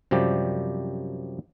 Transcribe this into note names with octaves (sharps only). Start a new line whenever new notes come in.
F#2 C3 F3 G3 G4 D5